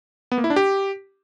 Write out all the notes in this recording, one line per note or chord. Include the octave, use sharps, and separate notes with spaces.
B3
A#3
E4
D4
G4